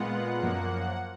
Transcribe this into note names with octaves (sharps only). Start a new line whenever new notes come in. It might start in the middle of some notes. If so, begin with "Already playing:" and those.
Already playing: A#2 G#3 B3 F4 F#5
F#2 F3 A#3